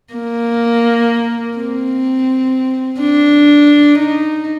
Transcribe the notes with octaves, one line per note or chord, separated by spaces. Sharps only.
A#3
C4
D4
D#4